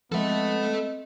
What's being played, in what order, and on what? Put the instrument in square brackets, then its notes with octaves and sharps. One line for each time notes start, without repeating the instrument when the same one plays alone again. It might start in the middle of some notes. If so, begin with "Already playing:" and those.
[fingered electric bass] F3 G#3 [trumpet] B3 [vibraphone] C4 D#5 [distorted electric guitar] A4 E5